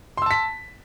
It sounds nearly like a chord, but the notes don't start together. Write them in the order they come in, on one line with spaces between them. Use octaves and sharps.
C6 E6 A5 B6